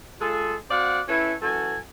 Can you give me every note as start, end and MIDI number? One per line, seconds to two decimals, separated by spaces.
0.20 0.56 56
0.20 0.56 65
0.20 0.56 68
0.20 0.56 69
0.70 1.01 60
0.70 1.01 66
0.70 1.01 74
0.70 1.01 77
0.70 1.01 78
1.08 1.35 61
1.08 1.35 64
1.08 1.35 69
1.08 1.35 71
1.08 1.35 73
1.42 1.79 42
1.42 1.79 52
1.42 1.79 66
1.42 1.79 69
1.42 1.79 80